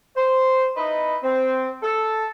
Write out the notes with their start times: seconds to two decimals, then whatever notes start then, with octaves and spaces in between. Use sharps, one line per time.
0.17 C5
0.77 D#4 E4 B4 D#5
1.24 C4
1.83 A4